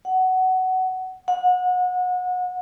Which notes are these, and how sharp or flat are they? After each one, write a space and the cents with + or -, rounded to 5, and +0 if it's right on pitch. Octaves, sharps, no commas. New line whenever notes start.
F#5 +15
F#5 -30